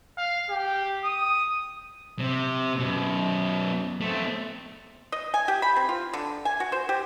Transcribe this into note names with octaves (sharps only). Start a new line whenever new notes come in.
F5
G4
D#6
C3
F#2 B2
A3 C4
D#5
G#5
G4
B5
C4
F4
D3
G#5
F#4
C5
G4